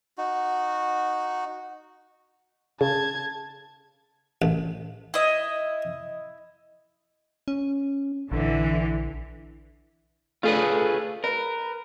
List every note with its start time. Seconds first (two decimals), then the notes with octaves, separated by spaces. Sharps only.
0.18 D#4 F#4
2.81 C#3 A5 G#6
4.42 A1
5.14 E4 D#5
7.48 C#4
8.32 A#1 D3 E3
10.43 A3 D4 F4 G#4 B4
11.24 A#4 B4